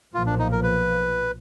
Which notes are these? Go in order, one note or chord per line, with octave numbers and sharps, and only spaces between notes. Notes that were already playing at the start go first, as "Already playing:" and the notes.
B1 A#2 F3 F4
D4
D#4
A#4
B4